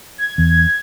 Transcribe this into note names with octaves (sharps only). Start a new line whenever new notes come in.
G#6
E2 G#6